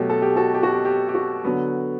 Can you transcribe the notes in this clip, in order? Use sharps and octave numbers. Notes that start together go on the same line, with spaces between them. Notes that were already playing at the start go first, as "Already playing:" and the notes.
Already playing: B2 F#3 A3 G4
A4
G4
F#4 A4
G4
F#4
G4
G4
G4
F#4
D3 F#3 B3